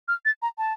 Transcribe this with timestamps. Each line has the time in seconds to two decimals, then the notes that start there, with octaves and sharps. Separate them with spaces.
0.08 F6
0.25 A6
0.42 A#5
0.58 A5